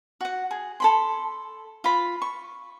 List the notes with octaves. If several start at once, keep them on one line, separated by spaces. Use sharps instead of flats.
F#4 F#5
G#4
A4 B5 C6
F4 B5
C#6